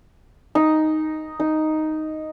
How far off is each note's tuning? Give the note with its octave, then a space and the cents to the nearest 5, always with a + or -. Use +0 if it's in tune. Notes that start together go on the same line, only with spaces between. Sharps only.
D#4 +0
D#4 +0